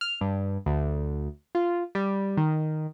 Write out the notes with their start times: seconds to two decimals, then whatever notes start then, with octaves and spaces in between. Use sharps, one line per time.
0.01 F6
0.21 G2
0.66 D2
1.55 F4
1.95 G3
2.37 D#3